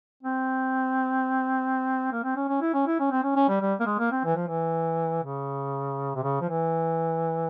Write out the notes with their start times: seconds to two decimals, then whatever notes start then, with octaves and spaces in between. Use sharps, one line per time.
0.23 C4
2.13 A#3
2.24 C4
2.37 C#4
2.48 C#4
2.61 E4
2.74 C#4
2.87 E4
3.00 C#4
3.11 C4
3.24 C#4
3.36 C#4
3.49 G3
3.61 G3
3.80 A#3
3.86 G#3
3.99 A#3
4.12 C4
4.25 E3
4.36 F3
4.48 E3
5.24 C#3
6.15 C3
6.24 C#3
6.41 F3
6.50 E3